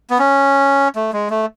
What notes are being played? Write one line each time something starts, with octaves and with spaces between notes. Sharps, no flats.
B3
C#4
A3
G#3
A3